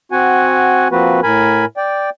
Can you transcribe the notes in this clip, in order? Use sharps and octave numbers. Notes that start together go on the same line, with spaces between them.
C4 F#4 F#5 G#5
F3 A#3 C4 F#4 B4
A2 A#4 G#5 B5
D5 G5